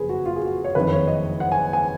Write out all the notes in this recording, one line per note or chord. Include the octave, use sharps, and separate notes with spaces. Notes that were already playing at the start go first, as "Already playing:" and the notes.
Already playing: F#1 F2 C#3 F3 G#4 B4
F#4
F4
G#4
F#4
C#5
F#1 F2 D#3 B4
C#5
D#5
F#5
G#5
G#5